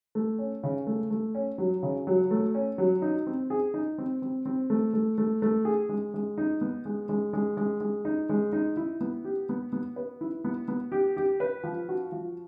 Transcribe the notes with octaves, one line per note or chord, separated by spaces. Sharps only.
A3
C#4
C#3
A3
A3
C#4
F#3
C#3
F#3
A3
C#4
F#3
D#4
C4
G#4
D#4
C4
C4
C4
A3
A3
A3
A3
G#4
G#3
G#3
D#4
B3
G#3
G#3
G#3
G#3
G#3
D#4
G#3
D#4
E4
B3
G4
B3
B3
B4
E4
B3
B3
G4
G4
B4
F3
F#4
F3